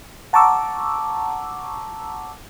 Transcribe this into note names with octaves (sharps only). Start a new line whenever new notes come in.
F#5 A5 A#5 C#6 D6 E6